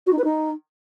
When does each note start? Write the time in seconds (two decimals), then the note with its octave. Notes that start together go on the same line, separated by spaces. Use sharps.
0.06 F#4
0.12 D#4
0.18 B4
0.24 D#4